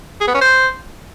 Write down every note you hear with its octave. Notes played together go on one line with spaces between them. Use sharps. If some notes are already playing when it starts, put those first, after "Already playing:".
G#4
B3
C#4
C5